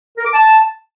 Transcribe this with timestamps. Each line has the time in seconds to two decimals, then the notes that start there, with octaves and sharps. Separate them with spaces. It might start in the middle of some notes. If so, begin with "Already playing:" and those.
0.18 A#4
0.26 D6
0.34 A5